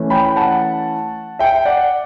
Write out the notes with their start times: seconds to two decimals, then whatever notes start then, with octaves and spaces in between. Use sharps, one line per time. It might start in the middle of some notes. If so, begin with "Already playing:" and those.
Already playing: E3 A3 C#4
0.10 G5 B5
0.36 F#5 A5
1.39 E5 G5
1.65 D5 F#5